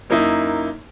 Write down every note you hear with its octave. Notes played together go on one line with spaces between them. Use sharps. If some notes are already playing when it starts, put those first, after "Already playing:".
F#2 A#3 D#4 E4